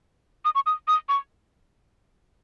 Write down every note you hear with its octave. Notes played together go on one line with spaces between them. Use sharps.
D#6
C#6
D#6
D#6
C#6